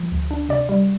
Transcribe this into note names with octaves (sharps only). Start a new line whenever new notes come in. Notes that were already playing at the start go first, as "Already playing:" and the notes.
Already playing: F3
D2
D4
C3 D5
G3